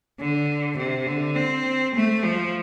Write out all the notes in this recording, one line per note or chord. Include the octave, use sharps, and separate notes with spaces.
D3
C3
D3
C4
A3
F3